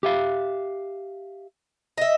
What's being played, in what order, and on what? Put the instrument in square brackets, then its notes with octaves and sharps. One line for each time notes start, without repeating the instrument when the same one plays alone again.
[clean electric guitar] G4 E5 F5
[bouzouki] D#5 E5